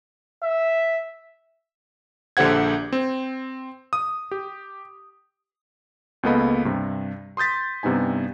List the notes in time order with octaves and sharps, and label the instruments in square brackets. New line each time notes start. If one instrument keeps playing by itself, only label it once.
[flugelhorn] E5
[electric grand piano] A#1 D3 G4 C5 F#5 G#6
C4
D#6
G4
C#2 A#3 B3 A4 D#5 B5
G2 C3
C6 D#6 G6 A6 B6
G2 C3 B3 D#4 G#5